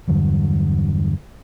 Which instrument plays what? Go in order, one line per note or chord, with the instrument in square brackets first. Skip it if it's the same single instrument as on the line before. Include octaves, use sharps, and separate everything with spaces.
[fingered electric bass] E2 G2 D3 F#3